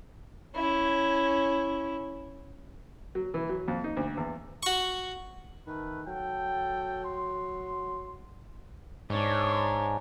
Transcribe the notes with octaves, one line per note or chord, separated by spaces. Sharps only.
C#4 E4
F#3
E3
F#3
F2
D#4
D2
E2
F#4 C#6
D#3 A3 A#4 B4
F#3 A4 G5
C6
G#2 D4 C#5